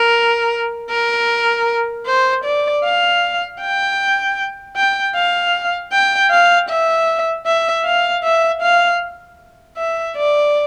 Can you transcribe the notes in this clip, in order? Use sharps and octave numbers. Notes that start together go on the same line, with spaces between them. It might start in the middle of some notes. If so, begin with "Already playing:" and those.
Already playing: A#4
A#4
C5
D5
F5
G5
G5
F5
G5
F5
E5
E5
F5
E5
F5
E5
D5